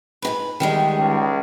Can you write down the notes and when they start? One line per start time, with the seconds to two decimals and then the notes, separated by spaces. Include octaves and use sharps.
0.22 G#2 B2 B4
0.60 E2 D#3 G3 G#3
0.96 C#2